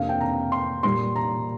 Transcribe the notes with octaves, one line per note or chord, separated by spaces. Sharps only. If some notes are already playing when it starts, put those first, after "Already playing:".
Already playing: F2 C3 A#3 D4 F5
G5
A#5
C6
A#2 G3 A#3 C6
A#5